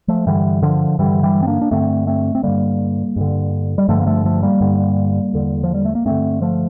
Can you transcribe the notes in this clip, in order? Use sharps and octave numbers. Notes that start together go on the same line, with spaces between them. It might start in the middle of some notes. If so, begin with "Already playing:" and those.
F3 A3
G2 D3 E3 G3
D3 F3
G2 D3 E3 G3
E3 G3
C4
A#3 D4
D4
G2 D3 A3 C4
A3 C4
C4
G2 D3 G3 A#3
G2 D3
G3
G2 D3 F3 A3
A#3
F3 A3
F3 A3
G3 A#3
G2 D3
E2 D3
F3
G3
A3
A#3
G2 D3 A3 C4
F3 A3